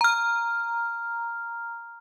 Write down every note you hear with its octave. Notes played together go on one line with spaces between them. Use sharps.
A#5 F6